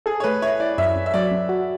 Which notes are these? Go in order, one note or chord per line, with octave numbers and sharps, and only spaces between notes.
G#4 A4
C#5
A3 B4
E4 C#5
E4 D5
F#2 E5
F#2
E5
F#3 D5
F#2
F#4